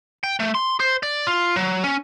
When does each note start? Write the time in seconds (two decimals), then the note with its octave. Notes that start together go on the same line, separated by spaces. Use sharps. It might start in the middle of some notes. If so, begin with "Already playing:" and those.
0.24 G5
0.40 A3
0.55 C6
0.80 C5
1.03 D5
1.27 F4
1.56 F#3
1.84 C#4